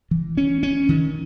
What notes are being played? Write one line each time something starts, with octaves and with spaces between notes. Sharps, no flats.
E3
C#4
C#4
D#3